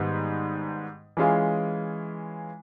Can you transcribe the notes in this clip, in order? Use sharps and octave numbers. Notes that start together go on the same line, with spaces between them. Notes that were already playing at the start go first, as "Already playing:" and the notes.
Already playing: G#2 D#3 G3 B3 D#4
E3 G#3 C#4 F4 G#4